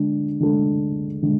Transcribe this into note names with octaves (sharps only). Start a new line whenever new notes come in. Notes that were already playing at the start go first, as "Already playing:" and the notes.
Already playing: D3 G#3 D4
D3 G#3 D4 A4
D3 G#3